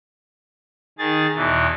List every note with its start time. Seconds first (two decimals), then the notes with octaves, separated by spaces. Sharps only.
0.98 D#3 G#4 A6
1.36 E2 B2 E3